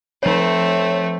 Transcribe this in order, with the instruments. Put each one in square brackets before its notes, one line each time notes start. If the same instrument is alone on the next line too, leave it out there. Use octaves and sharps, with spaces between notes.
[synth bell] F3 C#5 [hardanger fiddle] A3 C4